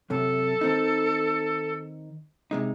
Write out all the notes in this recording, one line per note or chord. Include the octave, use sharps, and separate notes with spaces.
F#2 C3 A4
D#3 C4 D#4
C3 G#3 D#4